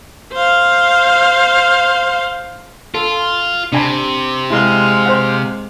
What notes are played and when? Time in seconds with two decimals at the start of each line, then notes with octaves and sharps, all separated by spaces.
0.33 C5 F5
2.95 F4 A4
3.73 C3 D4 G#5 B5
4.50 G#3 E4 F5 C6
5.06 C5 F#5